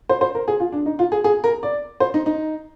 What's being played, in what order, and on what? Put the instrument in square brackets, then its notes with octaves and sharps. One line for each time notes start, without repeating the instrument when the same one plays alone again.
[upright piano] C5
C5
A#4
G#4
F4
D4
D#4
F4
G#4
G#4
A#4
D5
C5
D#4
D#4